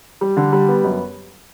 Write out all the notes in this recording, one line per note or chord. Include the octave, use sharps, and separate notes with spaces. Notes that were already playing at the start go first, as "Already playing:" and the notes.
G3
D3
G3
B3
F#2